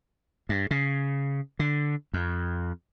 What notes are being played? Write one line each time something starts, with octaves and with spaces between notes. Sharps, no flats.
G2
C#3
D3
F2